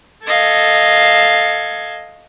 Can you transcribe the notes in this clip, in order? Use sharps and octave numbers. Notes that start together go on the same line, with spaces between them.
A4 D#5 F5 G#6